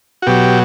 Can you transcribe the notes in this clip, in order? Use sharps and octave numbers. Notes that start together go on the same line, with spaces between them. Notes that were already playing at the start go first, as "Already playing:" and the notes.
F#4
B2 F#3 G4